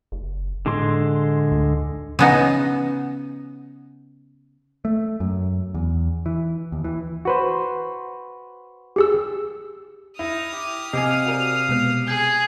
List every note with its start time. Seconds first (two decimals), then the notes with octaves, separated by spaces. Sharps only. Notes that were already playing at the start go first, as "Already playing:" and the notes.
0.12 F#1
0.66 A2 D3 G#3 C6
1.52 D2
2.19 C#3 B3 D#4
4.85 A3
5.20 F#2
5.74 E2
6.26 E3
6.72 D#2
6.84 E3
7.25 F#4 B4 C5
8.96 G4 G#4 E6
10.19 D#4 E4 D#6 F6
10.52 G4
10.93 C3 D#5 F5 G#5
11.26 F#4 A#4 D5
11.69 B2 G#3 B3
12.07 G#4 G#5 G6